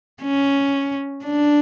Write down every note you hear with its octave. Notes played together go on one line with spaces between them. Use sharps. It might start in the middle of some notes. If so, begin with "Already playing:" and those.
C#4
D4